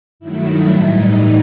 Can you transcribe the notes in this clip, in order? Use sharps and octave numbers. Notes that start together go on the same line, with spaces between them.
G2 D#3 F#3 A3 E4
A2 E3 G3 D#4